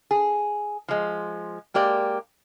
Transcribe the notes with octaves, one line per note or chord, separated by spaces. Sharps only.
G#4
F3 G#3
G#3 A#3 G4 D5